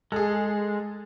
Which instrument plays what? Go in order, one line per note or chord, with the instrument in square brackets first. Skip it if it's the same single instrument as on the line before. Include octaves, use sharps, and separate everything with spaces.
[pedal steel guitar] G#3 [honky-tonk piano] G#4 A4